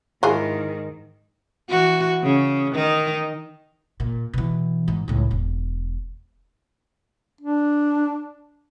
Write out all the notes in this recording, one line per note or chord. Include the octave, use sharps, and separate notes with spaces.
G#2 D#3 E3 F4 G#4
E3 F#4
C#3
D#3 D#4
A#2
B2 E3
G#2
C#2 A2
E1
D4